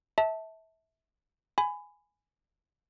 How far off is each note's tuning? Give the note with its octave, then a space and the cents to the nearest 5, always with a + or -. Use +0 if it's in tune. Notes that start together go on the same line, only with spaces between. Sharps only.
E5 -25 A5 +0
G#5 +0 B5 +20